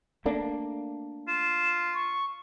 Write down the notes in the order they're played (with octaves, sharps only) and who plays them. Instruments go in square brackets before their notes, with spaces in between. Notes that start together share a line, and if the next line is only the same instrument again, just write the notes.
[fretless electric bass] A3 A#3 D4
[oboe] F4 [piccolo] E7
[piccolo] C#6